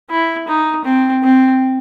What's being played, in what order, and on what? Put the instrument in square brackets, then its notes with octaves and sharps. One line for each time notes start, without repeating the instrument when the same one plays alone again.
[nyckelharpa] E4
D#4
C4
C4